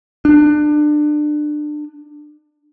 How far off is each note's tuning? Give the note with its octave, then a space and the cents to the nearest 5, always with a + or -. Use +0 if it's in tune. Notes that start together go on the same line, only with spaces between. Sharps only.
D4 +25